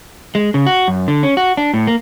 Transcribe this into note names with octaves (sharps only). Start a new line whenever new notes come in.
G#3
C#3
F#4
F#2
D3
C#4
F#4
D4
A2
A#3